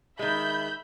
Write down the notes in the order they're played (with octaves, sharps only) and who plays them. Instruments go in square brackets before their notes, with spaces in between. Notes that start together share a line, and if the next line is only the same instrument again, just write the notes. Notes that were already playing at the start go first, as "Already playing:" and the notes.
[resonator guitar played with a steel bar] D#3 G#3 [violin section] E5 B5 G6